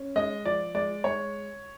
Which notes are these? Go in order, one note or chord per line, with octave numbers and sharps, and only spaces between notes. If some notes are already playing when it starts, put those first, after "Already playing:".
Already playing: C#4
G#3 D#5
F3 D5
G#3 D5
G#3 C#5